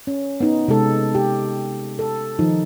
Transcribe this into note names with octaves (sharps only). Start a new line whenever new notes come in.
C#4
B3 D#4
C3 G#3 A4
G4
A4
D#3 F3 D#4